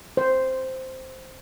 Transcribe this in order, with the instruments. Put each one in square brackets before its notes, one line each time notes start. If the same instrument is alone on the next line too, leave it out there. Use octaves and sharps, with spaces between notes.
[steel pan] C5